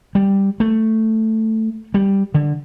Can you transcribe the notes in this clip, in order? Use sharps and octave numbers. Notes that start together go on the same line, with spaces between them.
G3
A3
G3
D3